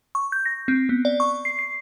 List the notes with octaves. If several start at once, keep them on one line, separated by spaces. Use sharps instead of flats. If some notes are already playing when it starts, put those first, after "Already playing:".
C#6
G6
A#6
C4
B3
D5
C#6
C7
C7